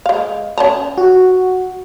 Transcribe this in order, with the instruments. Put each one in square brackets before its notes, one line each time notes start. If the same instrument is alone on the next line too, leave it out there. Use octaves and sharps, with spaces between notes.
[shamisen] G#3 F5
C#4 A5 A#5
[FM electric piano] F#4